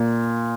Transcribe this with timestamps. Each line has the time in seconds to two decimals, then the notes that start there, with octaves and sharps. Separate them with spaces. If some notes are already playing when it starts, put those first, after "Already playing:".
Already playing: A#2